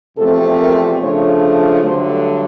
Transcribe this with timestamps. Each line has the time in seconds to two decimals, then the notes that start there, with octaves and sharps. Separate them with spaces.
0.16 E2 C3 F3 A3 C4 A4
0.58 A#4
1.00 C#3 F3 A3 D4 C#5
1.83 G2 D3 F#3 A3 C5